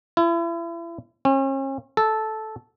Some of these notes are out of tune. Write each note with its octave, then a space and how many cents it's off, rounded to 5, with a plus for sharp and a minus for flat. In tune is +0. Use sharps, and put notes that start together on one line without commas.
E4 +35
C#4 -40
A4 -10